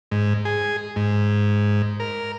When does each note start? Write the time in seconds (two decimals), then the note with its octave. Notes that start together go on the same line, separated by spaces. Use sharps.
0.11 G#2
0.45 G#4
0.96 G#2
2.00 A#4